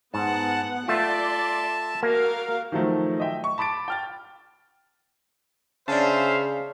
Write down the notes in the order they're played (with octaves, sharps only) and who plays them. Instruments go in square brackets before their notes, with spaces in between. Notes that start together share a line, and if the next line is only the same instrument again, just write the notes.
[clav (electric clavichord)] G#2 [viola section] B3 F#5 [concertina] A5
[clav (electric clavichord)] A3 F4 [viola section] D5 C6 [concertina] E5 A5
[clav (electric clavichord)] A#3 [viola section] F#4 A#4 F5
[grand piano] D#3 F3 F#3 A3
D#5 E5 G5
C#6
A5 B5 D6 A6 D7
G5 F6 A6
[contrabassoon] C#3 [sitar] C#4 [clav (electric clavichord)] D4 A5 [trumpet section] C5 E5 F5